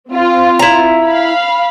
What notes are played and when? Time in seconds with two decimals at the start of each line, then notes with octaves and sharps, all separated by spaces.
0.10 C4 F4
0.59 E4 A#5
1.04 F5 B5